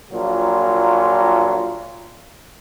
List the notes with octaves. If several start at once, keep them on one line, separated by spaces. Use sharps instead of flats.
A#1 A#2 F#3 F4